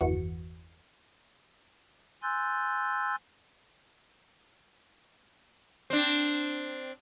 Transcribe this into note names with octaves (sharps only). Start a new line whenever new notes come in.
G1 E2 E3 F#4 C#7
G#5 C6 E6 F#6 G6 A6
C4 D4